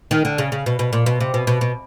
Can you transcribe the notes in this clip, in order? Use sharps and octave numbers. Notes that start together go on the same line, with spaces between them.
D#3
D3
C#3
C#3
B2
B2
A#2
B2
C3
B2
B2
B2